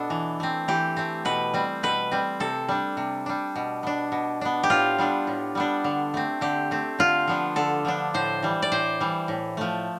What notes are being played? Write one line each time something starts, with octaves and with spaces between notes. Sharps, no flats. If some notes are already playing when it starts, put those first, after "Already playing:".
Already playing: B2 B3 D4 A4
E3
A3 C4
E3 G4
A3 C4
B2 B4
G3 C4
B2 B4
G3 C4
C3 A4
G3 D4
C3
G3 D4
B2
B3 D4
B2
B3 D4
G4
A2 F4
G3 B3 D4
A2
G3 B3 D4
D3
A3 C4
D3 G4
A3 C4
D3 F4
F3 B3 D4
D3 A4
F3 B3 D4
A2 C5
E3 G3
D5
A2 C5
E3 G3
A2
F3 A3